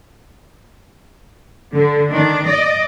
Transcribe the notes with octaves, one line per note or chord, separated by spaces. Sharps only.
D3
D#3 D4
D5 D#5